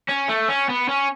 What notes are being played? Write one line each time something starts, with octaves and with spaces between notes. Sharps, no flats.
C#4
A3
C#4
B3
C#4